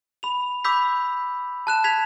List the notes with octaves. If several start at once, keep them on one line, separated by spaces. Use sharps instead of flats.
B5 F7
B5 D6 E6 G6 B6
A5 F#6 E7
G#6 B6 F7